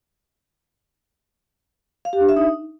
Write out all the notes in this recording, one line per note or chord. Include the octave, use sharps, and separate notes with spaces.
F5
G4
D4
E5
D#4